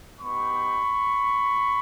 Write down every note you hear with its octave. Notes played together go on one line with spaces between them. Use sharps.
B3 D#4 G4 B5 C#6